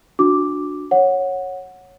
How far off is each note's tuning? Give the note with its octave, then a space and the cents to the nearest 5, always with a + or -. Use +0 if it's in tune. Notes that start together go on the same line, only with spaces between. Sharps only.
D4 +0 F#4 -25 D6 +0
C#5 -10 F#5 -10